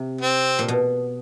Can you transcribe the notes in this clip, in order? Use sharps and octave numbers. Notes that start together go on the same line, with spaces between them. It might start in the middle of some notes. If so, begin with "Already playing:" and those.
Already playing: C3
C4
A#2
B2